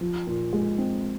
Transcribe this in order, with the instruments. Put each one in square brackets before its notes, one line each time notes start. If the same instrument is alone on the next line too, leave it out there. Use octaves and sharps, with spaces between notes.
[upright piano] F3
A#2
G#3
C4